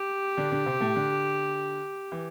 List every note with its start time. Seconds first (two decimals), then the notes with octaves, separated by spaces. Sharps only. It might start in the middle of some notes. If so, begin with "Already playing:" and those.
Already playing: G4
0.37 D3 D4
0.51 D3 D4
0.66 C3 C4
0.81 A2 A3
0.96 D3
2.12 E3